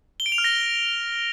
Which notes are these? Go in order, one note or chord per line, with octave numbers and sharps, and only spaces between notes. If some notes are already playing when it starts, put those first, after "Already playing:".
G7
D7
F7
F6
A#6